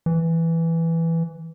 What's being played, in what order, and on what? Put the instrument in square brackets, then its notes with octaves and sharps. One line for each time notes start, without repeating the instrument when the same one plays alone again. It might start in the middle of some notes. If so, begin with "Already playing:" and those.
[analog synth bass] E3